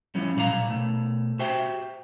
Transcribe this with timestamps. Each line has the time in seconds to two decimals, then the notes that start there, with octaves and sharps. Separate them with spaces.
0.15 E3 F3 G3 C#4
0.36 B1 A#2 D5 F5 A#5
0.68 B2 A3
1.39 F#4 G4 C5 E5 G5